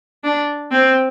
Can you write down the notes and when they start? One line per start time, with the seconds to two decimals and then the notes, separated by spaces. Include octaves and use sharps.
0.24 D4
0.72 C4